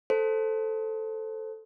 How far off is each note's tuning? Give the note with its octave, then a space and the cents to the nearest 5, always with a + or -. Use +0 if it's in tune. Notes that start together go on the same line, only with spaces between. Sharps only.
A4 +0 C5 +5